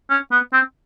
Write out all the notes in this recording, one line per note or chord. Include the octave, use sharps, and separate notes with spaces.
C#4
B3
C4